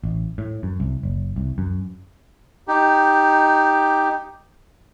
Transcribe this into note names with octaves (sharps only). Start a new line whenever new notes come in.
A1
A2
F#2
C2
F#1
C2
F#2
D#4 G4